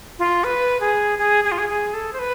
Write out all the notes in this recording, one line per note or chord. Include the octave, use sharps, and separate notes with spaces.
F4
B4
G#4
G#4
G#4
F4
G#4
G#4
A4
C5
B4